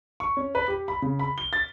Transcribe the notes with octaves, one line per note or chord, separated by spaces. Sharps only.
C#6
C#4
B4
G4
B5
C#3
B5
G7
A6